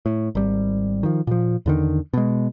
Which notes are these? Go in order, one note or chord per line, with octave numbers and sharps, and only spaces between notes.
A2
G#1 G3
D#3 F3
A#2 F3
E2 D3 D#3
B2 G#3